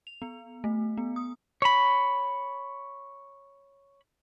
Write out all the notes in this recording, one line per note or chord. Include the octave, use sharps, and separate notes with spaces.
F7
B3
A3
B3
D#6
C#5 B5